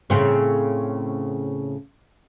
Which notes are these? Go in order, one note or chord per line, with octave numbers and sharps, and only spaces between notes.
A2 C#3 C4